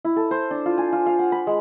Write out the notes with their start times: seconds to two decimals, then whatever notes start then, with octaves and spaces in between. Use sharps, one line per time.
0.05 E4
0.16 A4
0.31 C5
0.51 D4
0.66 F4
0.78 G#5
0.93 F4
1.06 F5
1.19 F#5
1.32 B5
1.47 G#3